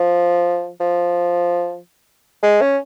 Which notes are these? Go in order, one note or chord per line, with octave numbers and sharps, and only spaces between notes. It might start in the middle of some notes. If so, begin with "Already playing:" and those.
Already playing: F3
F3
G#3
C#4